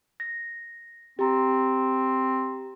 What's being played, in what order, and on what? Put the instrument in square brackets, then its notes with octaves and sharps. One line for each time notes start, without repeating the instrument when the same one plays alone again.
[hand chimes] A#6
[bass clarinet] C4 [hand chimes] G4 A#5